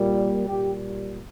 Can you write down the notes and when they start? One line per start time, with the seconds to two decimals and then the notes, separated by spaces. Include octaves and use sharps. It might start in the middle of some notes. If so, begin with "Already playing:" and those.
Already playing: A#2 G3
0.46 A#2 G3 G4